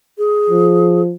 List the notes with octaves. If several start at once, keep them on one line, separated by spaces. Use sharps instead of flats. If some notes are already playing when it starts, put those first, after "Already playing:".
G#4
F3